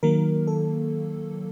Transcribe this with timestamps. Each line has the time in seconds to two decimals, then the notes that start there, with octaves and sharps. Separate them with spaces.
0.03 D#3 F#3 A#3 A#4
0.47 A4